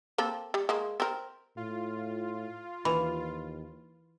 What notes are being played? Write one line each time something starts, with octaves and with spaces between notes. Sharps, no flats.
A#3 C4 A4
G3
G#3 A#3
C4 A#4
A2 F4
D#2 E3 B5